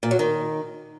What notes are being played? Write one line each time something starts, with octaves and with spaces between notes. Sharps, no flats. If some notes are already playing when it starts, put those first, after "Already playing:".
A#2
F#3
D#3